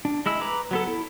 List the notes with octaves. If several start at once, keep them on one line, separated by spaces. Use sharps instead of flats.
D4
G#3 E4 E6
B4 A#5 D6
F#3 B3 A4
E4